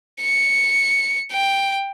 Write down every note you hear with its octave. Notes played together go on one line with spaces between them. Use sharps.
C#7
G5